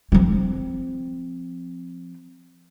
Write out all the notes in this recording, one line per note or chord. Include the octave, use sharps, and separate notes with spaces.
F3 C4